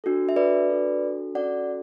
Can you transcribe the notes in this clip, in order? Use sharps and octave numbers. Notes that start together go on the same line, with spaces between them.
D4 F#4 A4
E5
B4 D5
D4 F#4 A4
C#4 F#4 A4 D5 F#5